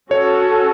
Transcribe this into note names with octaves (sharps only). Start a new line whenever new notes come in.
C#4 F#4 A4 C#5